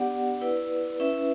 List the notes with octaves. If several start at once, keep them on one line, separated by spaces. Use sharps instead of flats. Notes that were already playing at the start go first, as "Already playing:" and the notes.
Already playing: B3 D4 G4 D5 F#5
E4 B4 D5
C#4 E4 B4 E5